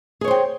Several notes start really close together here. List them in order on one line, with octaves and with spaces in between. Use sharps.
G#4 C#5 C5 G5